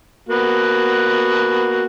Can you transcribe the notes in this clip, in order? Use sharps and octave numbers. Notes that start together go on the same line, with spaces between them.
A#3 B3 F#4